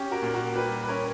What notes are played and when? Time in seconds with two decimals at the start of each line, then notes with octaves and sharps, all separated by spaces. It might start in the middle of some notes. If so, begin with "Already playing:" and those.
Already playing: C#4 G4
0.11 F#4 A#4
0.22 A#2
0.34 F#4 A#4
0.55 G3 G4 B4
0.82 B4
0.88 C#4 A#4 C#5